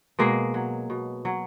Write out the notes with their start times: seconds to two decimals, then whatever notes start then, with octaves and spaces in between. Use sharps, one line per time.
0.19 B2 G#3 A#3
0.54 F#3
0.90 B2
1.25 F#3